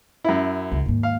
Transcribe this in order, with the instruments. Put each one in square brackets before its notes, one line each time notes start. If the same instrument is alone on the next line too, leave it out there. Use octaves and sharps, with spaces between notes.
[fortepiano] F#2 E4
[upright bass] C#2
D#2 G#2
[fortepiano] F5